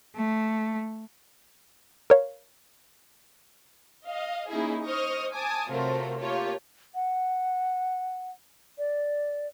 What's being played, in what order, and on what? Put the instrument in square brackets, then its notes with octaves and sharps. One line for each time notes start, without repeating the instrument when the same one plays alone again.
[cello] A3
[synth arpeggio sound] A#4 C#5 F5
[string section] D#5 F5
A#3 C#4 D#4 E4 G#4
C5 D#5 C#6 D#6 F6
G#5 A5 D6 D#6
C3 F#3 A3 F4 A#4 C5
A3 A#3 F4 G4 C#5
[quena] F#5
D5